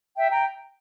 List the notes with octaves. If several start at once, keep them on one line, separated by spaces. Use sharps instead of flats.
E5 G5
G5 A#5